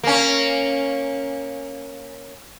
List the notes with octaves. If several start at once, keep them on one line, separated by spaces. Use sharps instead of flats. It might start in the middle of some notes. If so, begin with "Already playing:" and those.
A#3 C#4